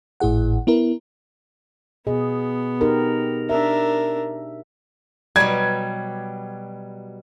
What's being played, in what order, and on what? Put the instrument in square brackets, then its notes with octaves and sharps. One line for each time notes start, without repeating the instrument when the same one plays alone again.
[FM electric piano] G#1 A2 E4 G#4 F#5
B3 E4 A#4
[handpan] B2 G#4 D#5 [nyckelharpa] B3
[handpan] D#4 G4 A#4
[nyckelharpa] D4 A#4 [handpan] E5
[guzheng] B2 F#3 G3 [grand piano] G#6